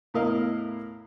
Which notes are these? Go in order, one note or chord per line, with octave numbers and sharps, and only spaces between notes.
E2 A2 E4 A#4 D#5 F5